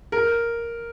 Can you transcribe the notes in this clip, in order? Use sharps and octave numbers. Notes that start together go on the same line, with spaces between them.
A#4